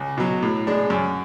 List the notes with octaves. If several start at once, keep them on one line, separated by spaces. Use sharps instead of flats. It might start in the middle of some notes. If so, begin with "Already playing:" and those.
Already playing: C#2
B2 F#3
A2
G#3 D4
F#2